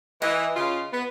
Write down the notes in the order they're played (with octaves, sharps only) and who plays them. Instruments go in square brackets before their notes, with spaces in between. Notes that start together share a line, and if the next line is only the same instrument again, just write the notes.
[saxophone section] E3 [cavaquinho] D#5
[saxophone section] C#3 F4
B3